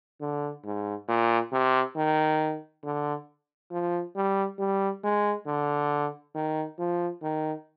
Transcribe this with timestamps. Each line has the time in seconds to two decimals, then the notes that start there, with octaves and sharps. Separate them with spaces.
0.21 D3
0.64 G#2
1.08 A#2
1.52 C3
1.96 D#3
2.84 D3
3.71 F3
4.16 G3
4.59 G3
5.04 G#3
5.47 D3
6.35 D#3
6.79 F3
7.23 D#3